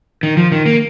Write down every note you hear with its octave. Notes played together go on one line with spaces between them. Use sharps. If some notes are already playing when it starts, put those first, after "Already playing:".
D#3
F3
D#3
A#3